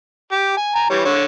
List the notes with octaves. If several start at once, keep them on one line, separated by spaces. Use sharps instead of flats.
G4
G#5
G#5 A#5
E3 G3 C#5
D3 C#5